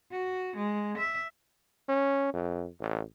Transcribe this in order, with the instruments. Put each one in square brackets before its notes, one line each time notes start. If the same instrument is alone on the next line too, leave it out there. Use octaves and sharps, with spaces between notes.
[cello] F#4
G#3
E5
[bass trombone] C#4
F2
A1